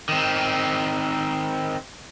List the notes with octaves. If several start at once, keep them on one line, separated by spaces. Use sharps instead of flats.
D#3 C4